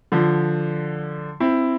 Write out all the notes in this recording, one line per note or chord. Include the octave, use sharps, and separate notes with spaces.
D3 F3
C4 E4